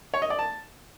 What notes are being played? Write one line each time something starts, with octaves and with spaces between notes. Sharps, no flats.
C#5
D#5
D5
A5